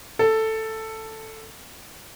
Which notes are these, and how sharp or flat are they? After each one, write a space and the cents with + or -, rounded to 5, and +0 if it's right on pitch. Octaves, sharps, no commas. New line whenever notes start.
A4 +5